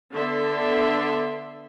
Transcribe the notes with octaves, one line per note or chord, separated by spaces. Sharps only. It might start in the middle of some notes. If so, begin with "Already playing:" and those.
D3 B3 D4 E5 C6